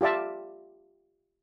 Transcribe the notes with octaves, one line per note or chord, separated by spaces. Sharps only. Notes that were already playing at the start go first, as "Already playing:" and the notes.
F4 G4 D5 E5 A5